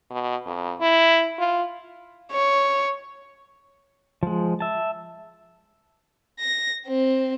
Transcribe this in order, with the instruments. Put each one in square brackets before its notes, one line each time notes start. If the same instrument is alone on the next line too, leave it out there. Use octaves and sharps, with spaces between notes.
[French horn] B2
F2
E4
F4
[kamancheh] C#5
[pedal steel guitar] F3 G#3
E5 A5
[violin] A#6
C4